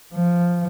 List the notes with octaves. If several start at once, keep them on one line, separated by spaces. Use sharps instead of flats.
F3